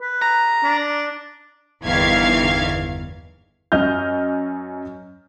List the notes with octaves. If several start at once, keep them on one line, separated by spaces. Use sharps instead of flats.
B4
A#5
D4
G1 E2 D#3 E3 F5 G#6
F#2 D#5 F6 G6